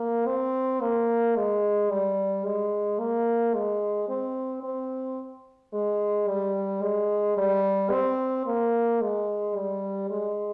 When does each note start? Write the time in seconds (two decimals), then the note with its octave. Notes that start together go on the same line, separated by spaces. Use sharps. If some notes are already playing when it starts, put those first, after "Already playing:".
Already playing: A#3
0.26 C4
0.81 A#3
1.36 G#3
1.90 G3
2.45 G#3
2.99 A#3
3.54 G#3
4.09 C4
4.63 C4
5.73 G#3
6.27 G3
6.82 G#3
7.37 G3
7.91 C4
8.46 A#3
9.01 G#3
9.56 G3
10.10 G#3